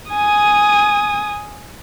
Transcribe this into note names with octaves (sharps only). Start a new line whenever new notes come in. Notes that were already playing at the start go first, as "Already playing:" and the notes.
G#5 D#6